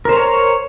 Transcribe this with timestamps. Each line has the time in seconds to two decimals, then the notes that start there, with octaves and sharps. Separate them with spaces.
0.05 A#4
0.09 C5
0.13 A#5
0.17 C#5